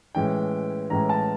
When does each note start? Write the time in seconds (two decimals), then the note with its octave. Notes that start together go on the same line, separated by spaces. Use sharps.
0.15 A2 E3 G#3 C#4 G5
0.90 A2 E3 G#3 C#4 A#5
1.09 A5